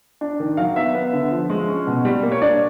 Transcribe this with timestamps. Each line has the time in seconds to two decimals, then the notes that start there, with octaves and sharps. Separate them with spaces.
0.21 D4
0.40 D#3
0.57 F#3 F5
0.76 B3 E5
0.95 B3
1.13 D3
1.31 F3
1.50 G#3
1.68 C#4
1.87 B2
2.05 G3
2.23 A#3
2.32 C#5
2.41 D4 D5